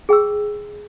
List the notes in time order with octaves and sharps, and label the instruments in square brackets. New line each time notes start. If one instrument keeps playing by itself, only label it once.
[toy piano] G#4 G5 C#6 E6